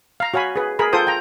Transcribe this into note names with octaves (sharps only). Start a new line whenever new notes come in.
F5 A#5
F#4 C#5 F5 G#5 B5
G#4 B4
G#4 A#4 B5
F4 A4 C5 G5 D#6
G5 A#5